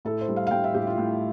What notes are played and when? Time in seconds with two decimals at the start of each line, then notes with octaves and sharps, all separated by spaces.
0.05 A2 A4
0.21 C5
0.28 G3
0.36 F5
0.47 F5
0.51 G3 G5
0.64 E5
0.74 A2 G4
0.87 F4
0.98 A2